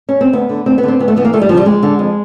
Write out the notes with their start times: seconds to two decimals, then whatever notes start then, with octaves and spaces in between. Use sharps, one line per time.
0.09 C#4
0.21 C4
0.33 D2 B3
0.49 D3
0.66 D2 C4
0.78 B3
0.83 D3 C4
0.99 D2 B3
1.08 A3
1.16 C#3 E3 B3
1.25 A#3
1.33 D2 A3
1.42 G3
1.49 E3 F3
1.52 C#3 G3
1.66 F2 G#3
1.83 D3
1.99 F2